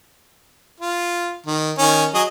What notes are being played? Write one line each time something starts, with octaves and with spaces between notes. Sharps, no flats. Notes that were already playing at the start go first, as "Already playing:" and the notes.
F4
D#3
D#3 C#4 G#5
F#3 G#4 D#5